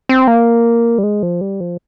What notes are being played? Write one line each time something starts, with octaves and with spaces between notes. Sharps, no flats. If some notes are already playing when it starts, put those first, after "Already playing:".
C4
A#3
G3
G#3
F3
G3
F3